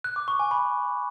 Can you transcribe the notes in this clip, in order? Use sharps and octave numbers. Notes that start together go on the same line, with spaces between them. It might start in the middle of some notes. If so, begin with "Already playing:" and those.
F#6
D6
C#6
G#5
B5